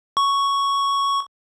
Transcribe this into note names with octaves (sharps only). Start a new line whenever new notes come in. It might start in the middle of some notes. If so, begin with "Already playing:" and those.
C#6